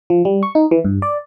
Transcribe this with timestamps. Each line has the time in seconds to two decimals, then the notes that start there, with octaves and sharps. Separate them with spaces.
0.10 F3
0.25 G3
0.43 C#6
0.55 D#4
0.71 E3
0.85 G2
1.02 D5